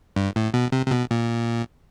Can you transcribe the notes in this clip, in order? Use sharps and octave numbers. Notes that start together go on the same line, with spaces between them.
G2
A2
B2
C3
C3
B2
A#2